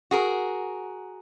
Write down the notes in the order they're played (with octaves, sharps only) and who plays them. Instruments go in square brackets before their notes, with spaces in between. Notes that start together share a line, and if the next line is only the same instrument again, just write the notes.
[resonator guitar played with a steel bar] F#4 G#4 A#4